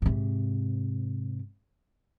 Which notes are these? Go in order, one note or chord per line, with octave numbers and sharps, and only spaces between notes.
G#2 C3